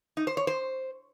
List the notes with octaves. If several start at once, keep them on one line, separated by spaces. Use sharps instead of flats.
D#4
C5
C#5
C5